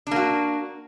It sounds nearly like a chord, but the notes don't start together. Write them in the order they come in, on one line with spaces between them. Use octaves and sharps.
D4 A#3 F#4